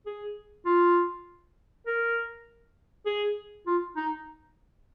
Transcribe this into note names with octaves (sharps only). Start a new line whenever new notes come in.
G#4
F4
A#4
G#4
F4
D#4